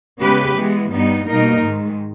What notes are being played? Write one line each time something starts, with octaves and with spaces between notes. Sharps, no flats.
C#3 G#3 B3 G4 B4
E3 G#3 B3
G2 G3 B3 D#4
B2 G3 A#3 D#4 A#4
G#2 D#3 G#3